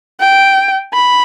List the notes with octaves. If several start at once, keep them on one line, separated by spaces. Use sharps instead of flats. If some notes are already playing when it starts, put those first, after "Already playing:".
G5
B5